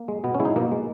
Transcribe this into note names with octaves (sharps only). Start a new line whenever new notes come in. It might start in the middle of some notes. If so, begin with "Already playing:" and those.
Already playing: A#3
G#3
B2 B3
C#4
G#3 E4
D#4
B2 A#3
G#3